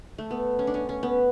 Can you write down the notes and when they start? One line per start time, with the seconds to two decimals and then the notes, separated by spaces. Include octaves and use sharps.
0.18 A3
0.31 B3
0.59 C#4
0.67 D4
0.74 C#4
0.89 C#4
1.03 B3